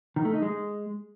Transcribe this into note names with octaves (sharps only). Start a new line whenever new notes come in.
D#3
A3
D#4
G#3